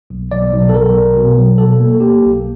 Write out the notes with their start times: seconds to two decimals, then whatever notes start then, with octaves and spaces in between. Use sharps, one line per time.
0.10 B1
0.31 B1 D5
0.53 B1
0.69 A4
0.73 B1 A#4
0.95 B1
1.16 B2
1.38 F#3
1.58 B2 A4
1.80 A#3
2.00 A#3 G4
2.22 B1